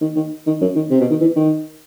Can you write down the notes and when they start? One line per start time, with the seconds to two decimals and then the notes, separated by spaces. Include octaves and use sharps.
0.01 D#3
0.16 D#3
0.47 D#3
0.61 F#2
0.76 D#3
0.91 C3
1.00 B2
1.11 D#3
1.21 E3
1.36 D#3